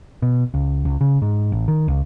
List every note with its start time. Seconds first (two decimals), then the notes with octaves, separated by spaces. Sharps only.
0.22 B2
0.54 C#2
0.85 C#2
1.01 C#3
1.22 G#2
1.52 A1
1.68 D#3
1.88 C#2